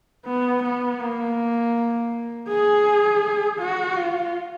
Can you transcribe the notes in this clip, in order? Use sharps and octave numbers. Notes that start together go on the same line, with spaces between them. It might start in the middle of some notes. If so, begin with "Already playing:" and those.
B3
B3
A#3
G#4
F#4
F4